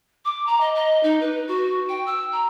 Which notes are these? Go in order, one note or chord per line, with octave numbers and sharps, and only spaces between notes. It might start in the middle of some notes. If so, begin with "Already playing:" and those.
D6
A#5
D#5
D#5
D#4
B4
F#4
G5
E6
A#5